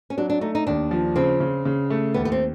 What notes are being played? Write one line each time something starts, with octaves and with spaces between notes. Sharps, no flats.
C#4
F#3 D4
D4
A3 D#4
D#4
D#2 D4
F3
C#3 C4
C#3
C#3
A3
D#2 B3
B3
C4